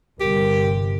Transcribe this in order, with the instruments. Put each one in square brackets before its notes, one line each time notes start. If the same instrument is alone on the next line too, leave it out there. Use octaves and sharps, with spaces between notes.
[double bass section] G1 C3 [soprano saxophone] G4 [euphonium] A#4